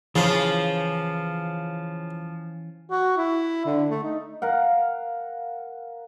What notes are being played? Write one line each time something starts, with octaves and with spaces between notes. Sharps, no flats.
C#3 E3 F3 C#4 E4 C5
F#4
E4
D3
A3
D#4
A#4 F5 F#5